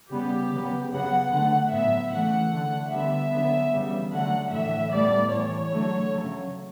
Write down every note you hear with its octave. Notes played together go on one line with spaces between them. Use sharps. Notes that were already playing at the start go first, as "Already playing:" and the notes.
C#3 G3 B3 G4
C#3 F#3 B3
C#3 F#3 B3 F#5
D3 A3 F#5
A2 F#3 B3 E5
C#3 E3 A3 F#5
D3 A3
D3 G3 B3 E5
D3 F#3 B3
C#3 E3 G3 B3
D3 F#3 A3 F#5
A2 E3 A3 E5
A2 G3 B3 D5
A2 E3 A3 C#5
D3 F#3 A3
C#3 F#3 A3